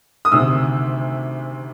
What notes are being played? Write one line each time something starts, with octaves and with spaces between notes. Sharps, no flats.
D#6
D2 C3 D#3 E6